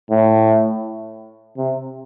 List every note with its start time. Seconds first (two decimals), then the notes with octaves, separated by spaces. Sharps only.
0.10 A2
1.57 C3